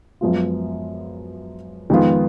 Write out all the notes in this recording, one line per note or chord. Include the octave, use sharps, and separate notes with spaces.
F#2 F3 G#3 B3 F4
F2 D#3 G#3 B3 F4